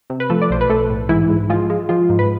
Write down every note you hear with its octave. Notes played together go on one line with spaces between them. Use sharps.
C3
B4
F3 A3 A4
D5
B1 C5
B4
B1 A3 A4
A2
G#2 E3 E4
G#2
F3 G#3 F4
G#3
F3 G#3 F4
G#2
B4